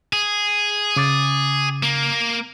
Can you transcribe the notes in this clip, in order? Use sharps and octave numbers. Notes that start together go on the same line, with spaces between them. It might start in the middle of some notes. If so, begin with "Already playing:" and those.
G#4
C#3 D6 A6
A#3